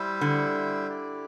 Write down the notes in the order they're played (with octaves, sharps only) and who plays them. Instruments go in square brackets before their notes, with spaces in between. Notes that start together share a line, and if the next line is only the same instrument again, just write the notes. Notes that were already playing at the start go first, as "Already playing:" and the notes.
Already playing: [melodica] G3 E4 C5 E5
[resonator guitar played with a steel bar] D3
[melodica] E4 G4 D5